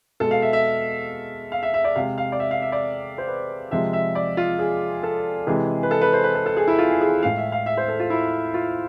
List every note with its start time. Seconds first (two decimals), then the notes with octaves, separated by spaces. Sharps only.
0.20 B2 G#3 A4
0.31 F5
0.42 E5
0.53 E5
1.52 F5
1.63 E5
1.74 E5
1.84 D5
1.96 C3 G#3 F5
2.18 F5
2.32 D5
2.40 E5
2.51 F5
2.62 E5
2.72 D5
3.18 C5
3.28 B4
3.71 C3 F3 G#3 E5
3.93 E5
4.15 D5
4.37 F4
4.59 G#4
5.03 A4
5.47 C3 E3 G#3 G#4
5.83 B4
5.91 A4
6.01 B4
6.13 C5
6.24 B4
6.35 A4
6.46 A4
6.57 G#4
6.68 E4
6.78 F4
7.01 G#4
7.23 A2 G#3 F5
7.37 E5
7.52 F5
7.66 E5
7.77 C5
7.88 A4
8.00 F4
8.10 E4
8.54 F4